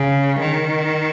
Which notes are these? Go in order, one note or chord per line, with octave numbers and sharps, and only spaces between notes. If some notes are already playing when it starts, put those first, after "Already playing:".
Already playing: C#3
D#3